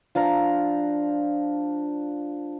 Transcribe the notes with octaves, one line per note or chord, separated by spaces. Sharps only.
F3 D4 F5 A#5